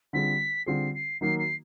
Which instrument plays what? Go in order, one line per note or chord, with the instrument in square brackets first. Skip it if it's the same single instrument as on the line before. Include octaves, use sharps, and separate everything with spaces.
[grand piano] D3 G3 C4 F4 G#4 [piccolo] B6
[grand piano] D3 G3 C4 F4 G#4 [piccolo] C7
[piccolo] C7
[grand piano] D#3 F#3 A#3 D#4 [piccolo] C7
[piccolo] C7